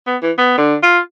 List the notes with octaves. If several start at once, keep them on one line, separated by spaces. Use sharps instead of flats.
B3
E3
B3
D3
F4